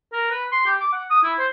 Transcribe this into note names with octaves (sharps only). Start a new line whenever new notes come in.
A#4
B4
C6
G4
D6
F#5
D#6
E4
C5